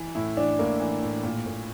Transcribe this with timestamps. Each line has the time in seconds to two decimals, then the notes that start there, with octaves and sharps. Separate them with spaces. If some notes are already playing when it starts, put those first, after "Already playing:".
Already playing: E3
0.15 A2 E4
0.37 E3 D4
0.59 A2 A#3
0.80 E3
1.03 A2
1.24 A#2
1.46 A#2